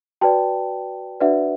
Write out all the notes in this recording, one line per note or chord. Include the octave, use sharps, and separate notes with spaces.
F#4 B4 D5 G5 A5
D4 F#4 B4 D5 E5 F#5